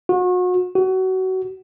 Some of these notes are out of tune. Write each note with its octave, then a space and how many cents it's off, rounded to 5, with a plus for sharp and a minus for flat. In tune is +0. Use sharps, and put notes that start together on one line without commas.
F#4 -35
F#4 +25